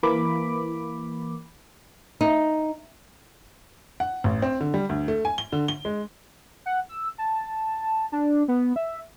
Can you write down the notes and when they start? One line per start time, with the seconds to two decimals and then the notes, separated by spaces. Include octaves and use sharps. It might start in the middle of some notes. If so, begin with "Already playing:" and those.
0.03 E3 A#3 B5 D6
2.21 D#4
4.00 F#5
4.24 A1
4.42 C4
4.61 D3
4.74 G3
4.89 D2
5.08 A3
5.25 G#5
5.38 G7
5.53 D3
5.68 G7
5.85 G#3
6.66 F#5
6.89 E6
7.18 A5
8.12 D4
8.48 B3
8.76 E5